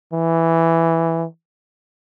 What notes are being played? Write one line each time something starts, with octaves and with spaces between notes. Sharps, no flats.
E3